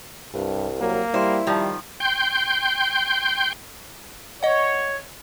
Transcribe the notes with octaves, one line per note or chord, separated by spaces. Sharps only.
C2 G2
F#3 A#3
G3 E4 C5
D#3 F3 G3
G5 C6 G6
C#5 D#5 F#5